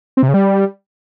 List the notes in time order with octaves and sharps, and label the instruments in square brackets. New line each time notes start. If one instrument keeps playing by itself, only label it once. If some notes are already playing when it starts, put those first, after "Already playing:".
[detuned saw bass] C4
C3
C#3
G3